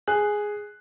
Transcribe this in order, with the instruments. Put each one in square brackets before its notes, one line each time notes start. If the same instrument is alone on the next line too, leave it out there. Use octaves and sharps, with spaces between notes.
[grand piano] G#4 F#6